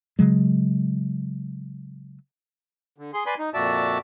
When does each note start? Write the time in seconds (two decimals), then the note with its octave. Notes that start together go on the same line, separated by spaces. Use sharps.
0.19 C#3 F#3 G#3
2.98 D3
3.14 G#4 C6
3.26 B4 D5 G#5 B5 C6
3.39 D#4
3.54 F2 A#2 F#4 D5 E5 A5